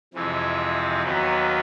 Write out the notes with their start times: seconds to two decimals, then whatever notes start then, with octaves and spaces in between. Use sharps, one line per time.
0.14 F2 C3 E3 G#3 C4
1.02 D#2 D#3 F#3 B3